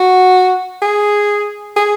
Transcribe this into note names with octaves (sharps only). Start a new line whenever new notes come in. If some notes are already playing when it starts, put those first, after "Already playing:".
Already playing: F#4
G#4
G#4